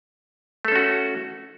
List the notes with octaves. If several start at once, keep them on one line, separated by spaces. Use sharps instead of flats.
A3 C#4 F#4 A4